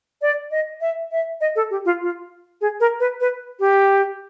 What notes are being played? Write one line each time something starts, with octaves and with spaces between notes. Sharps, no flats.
D5
D#5
E5
E5
D#5
A4
G4
F4
F4
G#4
A#4
B4
B4
G4